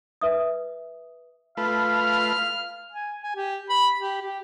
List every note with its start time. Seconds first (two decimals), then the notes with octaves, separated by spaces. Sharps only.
0.21 B4 E5 D#6
1.57 A3 F4 B4 F5
1.95 F6
2.92 G#5
3.22 G#5
3.36 G4
3.70 B5
3.99 G4
4.22 G4